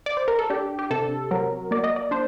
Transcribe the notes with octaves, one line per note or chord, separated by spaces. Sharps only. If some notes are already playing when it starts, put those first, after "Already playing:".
D5
C5
A#4
A4
D4 G4
G4
C3 A4
F#3 A#4
A#3 D5
D#5
D5
D4 C5